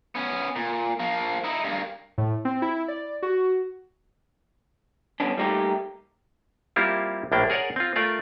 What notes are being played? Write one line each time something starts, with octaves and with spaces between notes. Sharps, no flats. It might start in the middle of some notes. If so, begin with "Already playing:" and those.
B3 C#4
A#2
F3 A#3
D#4 E4
G2 A#3
A2
C4
E4
D5
F#4
G2 D3 B3 C#4 D4
G3 A3 A#3 D#4 F#4 G4
G3 A#3 C4 E4 F4 G4
A#1 A2 A#3 D4 G5
G#4 A#4 C#5 D5 F#5
C4 F4
A3 F4 A#4 D5